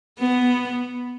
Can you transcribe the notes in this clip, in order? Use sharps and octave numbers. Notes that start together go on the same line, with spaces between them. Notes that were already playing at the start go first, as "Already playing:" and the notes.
B3